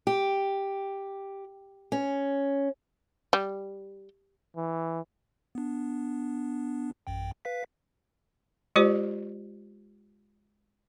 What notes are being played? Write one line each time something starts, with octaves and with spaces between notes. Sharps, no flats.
G4
C#4
G3
E3
B3 D4
A1 F#2 G5
B4 F5 B6
G#3 F4 G4 C5 D5